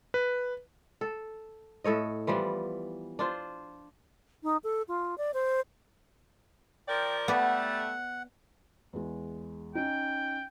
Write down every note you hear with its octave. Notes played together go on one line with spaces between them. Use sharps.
B4
A4
A2 A4 C#5 D#5
E3 F3 G3 B3
D4 F4 C5
D#4
A4
F4
D5
C5
F3 A#4 D5 G5
G3 A3 B3 D5 F#5
E2 G#3
C#4 D#4 G5